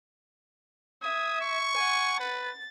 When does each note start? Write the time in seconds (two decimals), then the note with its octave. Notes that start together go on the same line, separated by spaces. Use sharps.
1.02 E5 D#6 G#6
1.41 C#6
1.74 F#5 G#5
2.20 B4 A6